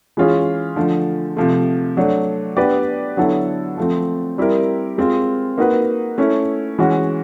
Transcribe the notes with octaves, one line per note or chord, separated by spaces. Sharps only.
E3 G#3 C#4 F4 G#4
D3 F3 A3
C3 F3 A3
F#3 A3 D4
B3 D4 G4 B4 D5
D3 F#3 B3 E4 A4
F3 A3 C4
G3 C4 E4 G4 A#4
G#3 C4 F4
A#3 D#4 F#4 B4
A3 C#4 E4
E3 G#3 C#4 F#4